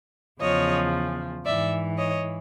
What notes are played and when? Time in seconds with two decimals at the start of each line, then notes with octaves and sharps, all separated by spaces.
0.41 E2 C#3 F3 C#5 D#5
1.45 G#2 E3 D5 E5
1.98 C#5 D#5